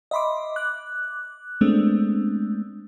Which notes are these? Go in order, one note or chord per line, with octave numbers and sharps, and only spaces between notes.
D#5 E5 B5 C6 D6
D6 F#6
G#3 A3 B3 C4 D4